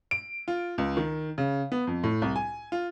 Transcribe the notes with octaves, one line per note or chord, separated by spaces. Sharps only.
D7
F4
C#2
D#3
C#3
B3
F2
A2
C2
G#5
F4